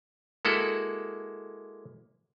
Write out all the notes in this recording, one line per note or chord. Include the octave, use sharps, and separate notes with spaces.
G#3 A#3 E4 F#4 A4